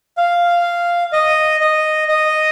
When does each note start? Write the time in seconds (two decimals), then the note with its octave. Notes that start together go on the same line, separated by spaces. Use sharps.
0.17 F5
1.13 D#5
1.61 D#5
2.09 D#5